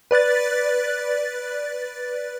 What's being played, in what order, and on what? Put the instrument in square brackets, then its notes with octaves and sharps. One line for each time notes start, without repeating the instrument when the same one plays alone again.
[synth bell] B4 D5 F#6 A6